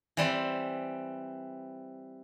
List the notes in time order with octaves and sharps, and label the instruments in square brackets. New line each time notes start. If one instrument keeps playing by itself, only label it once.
[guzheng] E3 G3 C4